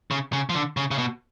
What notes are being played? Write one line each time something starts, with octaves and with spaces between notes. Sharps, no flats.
C#3
C#3
F3
D3
C#3
C#3
B2